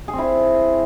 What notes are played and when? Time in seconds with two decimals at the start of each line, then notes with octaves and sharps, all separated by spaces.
0.08 G#4
0.13 C4
0.18 E4